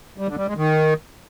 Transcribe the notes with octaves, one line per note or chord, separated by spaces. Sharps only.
G3
D3
G3
G#3
D#3